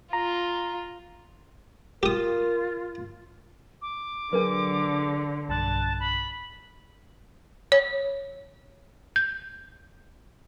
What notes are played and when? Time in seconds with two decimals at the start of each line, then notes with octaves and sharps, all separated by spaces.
0.13 F4 A#5
2.03 F4 G4 A#4 D#6
3.82 D6
4.33 D3 F#3 D4 G#4 A#4 B4
5.49 B1 G2 A5 F#6
6.00 B5
7.72 C#5
9.16 G6